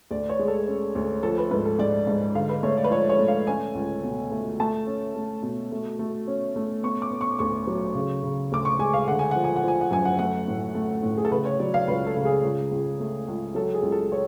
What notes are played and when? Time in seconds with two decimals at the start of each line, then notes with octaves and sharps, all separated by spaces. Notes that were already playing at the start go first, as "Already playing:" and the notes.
0.11 D2 D5
0.29 C#5
0.39 G#3
0.48 A4
0.68 C#4
0.95 D2
1.23 F3 A4
1.38 B4
1.51 G#2 B4
1.66 A4
1.79 G#2 D5
2.07 G#2
2.35 D3 F5
2.49 B4
2.63 A3 C#5
2.77 D5
2.84 B4
2.91 F3 C#5
3.10 C#5
3.19 A3
3.28 F5
3.47 C#4 G#5
3.75 C#2
4.04 B2
4.32 A3
4.60 A3 A5
4.87 C#4
5.16 A3
5.43 B2
5.72 A3
5.99 A3
6.28 C#4
6.56 A3
6.83 B3 C#6
7.02 D6
7.11 B3
7.21 C#6
7.39 D2 C#6
7.67 F#3
7.95 C#3
8.23 C#3
8.52 D2 D6
8.65 C#6
8.79 G#3 G#5
8.94 F5
9.07 D3 F#5
9.19 G#5
9.31 F3 F#5
9.44 G#5
9.56 F#5
9.64 F3 G#5
9.81 F#5
9.91 F#2 G#5
10.05 F#5
10.19 A3 F#5
10.48 A2
10.75 A3
11.03 A2
11.17 G#4
11.25 A4
11.31 C#3 B4
11.45 C#5
11.59 F#3 D5
11.74 F5
11.87 C#2 B4
12.06 A4
12.16 C#3
12.25 G#4
12.43 C#2
12.72 C#2
13.00 A3
13.28 C#2
13.55 F#3 A4
13.74 G#4
13.83 C#2
13.92 A4
14.12 C#5